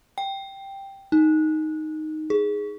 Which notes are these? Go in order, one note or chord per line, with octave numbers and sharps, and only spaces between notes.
G5
D#4
G#4